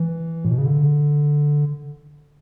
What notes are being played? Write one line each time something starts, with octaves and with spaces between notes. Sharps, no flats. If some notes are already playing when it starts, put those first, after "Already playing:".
Already playing: E3
A2
B2
C#3
D3